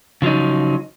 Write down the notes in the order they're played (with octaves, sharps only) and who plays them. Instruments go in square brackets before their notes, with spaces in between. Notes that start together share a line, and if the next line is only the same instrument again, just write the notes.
[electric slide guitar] C#3 F3 F#3 D#4